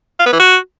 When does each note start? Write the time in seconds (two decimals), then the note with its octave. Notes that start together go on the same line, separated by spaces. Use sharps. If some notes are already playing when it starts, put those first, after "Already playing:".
0.19 F4
0.26 B3
0.33 E3
0.39 F#4